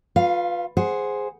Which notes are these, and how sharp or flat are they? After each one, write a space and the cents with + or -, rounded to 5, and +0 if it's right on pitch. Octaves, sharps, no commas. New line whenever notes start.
F4 +25 B4 +0 F5 -10
G#4 +0 C5 +0 F#5 +0